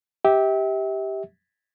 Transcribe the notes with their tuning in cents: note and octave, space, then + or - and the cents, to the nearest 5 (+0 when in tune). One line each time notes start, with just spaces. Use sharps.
G4 +0 E5 -35